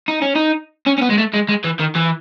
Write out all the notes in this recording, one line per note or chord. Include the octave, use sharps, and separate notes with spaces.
D#4
C#4
D#4
C#4
C#4
B3
G#3
A3
G#3
G#3
E3
D#3
E3